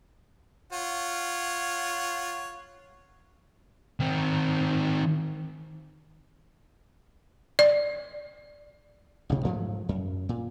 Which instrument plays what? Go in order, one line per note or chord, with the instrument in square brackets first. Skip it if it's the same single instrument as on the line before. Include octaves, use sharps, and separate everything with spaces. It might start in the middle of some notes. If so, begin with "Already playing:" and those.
[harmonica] F4 C#5 F#5
[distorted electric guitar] D#3 C4
[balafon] D5
[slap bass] A1 D2 C3
G#2 F3 F#3 A3
F#2
A#2